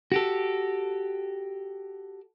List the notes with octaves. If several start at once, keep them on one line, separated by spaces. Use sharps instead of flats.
F#4 G4 A4